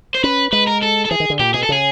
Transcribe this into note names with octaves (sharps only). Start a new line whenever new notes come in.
C5
C#4 B4
G#3 B4
A#4
A4
A4
E3 G#4
D#3
D3
A#2 G4
B2 G#4
A4
C#3 G#4